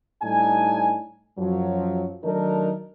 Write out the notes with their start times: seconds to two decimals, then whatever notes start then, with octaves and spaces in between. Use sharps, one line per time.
0.22 A2 G3 D4 D#4 G#5
1.38 F#2 F3 F#3
2.24 D#3 F#3 A3 D4 D#4 A#4